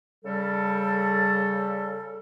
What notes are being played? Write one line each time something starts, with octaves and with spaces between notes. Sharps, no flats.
C#3 G3 A4